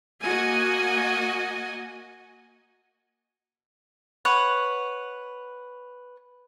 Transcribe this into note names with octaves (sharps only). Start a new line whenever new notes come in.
A#3 F#4 D#5 G#5
B4 C#5 F#5